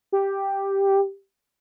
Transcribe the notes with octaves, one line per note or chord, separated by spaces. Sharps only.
G4